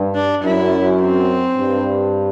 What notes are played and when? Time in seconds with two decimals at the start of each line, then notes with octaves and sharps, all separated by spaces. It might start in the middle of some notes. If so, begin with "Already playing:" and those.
Already playing: G2
0.14 D4
0.43 F#2 E4
1.00 C4
1.57 G2